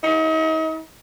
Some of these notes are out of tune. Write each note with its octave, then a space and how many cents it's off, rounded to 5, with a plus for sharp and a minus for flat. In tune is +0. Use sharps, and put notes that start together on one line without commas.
D#4 +40